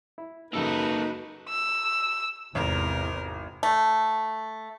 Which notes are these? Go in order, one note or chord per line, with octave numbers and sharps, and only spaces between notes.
E4
F#2 C#3 A#3 D#4 F#4 A4 B4 E6
E6
G#1 E2 C3 A#4
A3